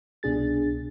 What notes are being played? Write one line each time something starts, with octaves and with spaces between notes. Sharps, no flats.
C2 B2 D4 G#4 A6